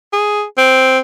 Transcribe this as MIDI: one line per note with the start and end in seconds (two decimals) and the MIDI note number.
0.13 0.43 68
0.58 0.99 60